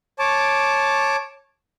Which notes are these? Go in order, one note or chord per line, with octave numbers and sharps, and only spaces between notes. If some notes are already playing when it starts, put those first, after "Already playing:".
C#5 A5 D6